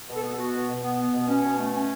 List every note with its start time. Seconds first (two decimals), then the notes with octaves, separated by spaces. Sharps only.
0.09 B2
0.16 A4
0.23 B3
0.33 A4
0.38 B3 F#4
0.54 B2
0.68 B2
0.83 B3
0.99 B3
1.13 B2
1.28 B2 C#4
1.43 B2
1.59 A3
1.74 C#4